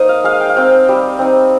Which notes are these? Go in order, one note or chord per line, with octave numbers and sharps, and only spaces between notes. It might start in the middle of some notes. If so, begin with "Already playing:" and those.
Already playing: A#3 D#4 A#4 C5 D#5
F5
G#3 F5
G5
F5
C4 D#4 G5
G3
C4 D#4